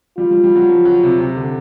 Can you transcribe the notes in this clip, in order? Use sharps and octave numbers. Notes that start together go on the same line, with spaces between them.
G3 F4
G3
G3
F#3
F3
F#3
C3
C3
D3